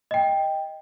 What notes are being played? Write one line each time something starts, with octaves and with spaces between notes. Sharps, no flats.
D#5 G5